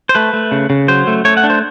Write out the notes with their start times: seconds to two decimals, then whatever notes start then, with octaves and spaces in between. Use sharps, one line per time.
0.09 C5
0.15 A3 B4
0.33 A3
0.52 C#3
0.70 C#3
0.88 F#3 C5
1.07 A3
1.25 A3 C#5
1.37 F#5
1.44 D4
1.50 C5